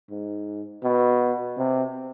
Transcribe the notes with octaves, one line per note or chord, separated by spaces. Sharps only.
G#2
B2
C3